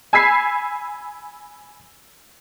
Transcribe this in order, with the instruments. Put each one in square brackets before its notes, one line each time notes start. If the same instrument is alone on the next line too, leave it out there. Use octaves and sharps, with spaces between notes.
[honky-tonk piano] G#5 B5 E6 G#6 B6 C7